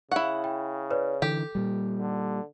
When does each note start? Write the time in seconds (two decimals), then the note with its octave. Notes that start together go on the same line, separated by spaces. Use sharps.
0.12 C#3 E4 F5 F#5 C#6
0.44 G5
0.91 B4 C#5 D5
1.22 D3 E3 G4 A4
1.55 A#2 G3
1.99 D3